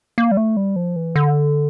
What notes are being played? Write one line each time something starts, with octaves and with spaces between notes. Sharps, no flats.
A#3
G3
A3
G3
F3
E3
D3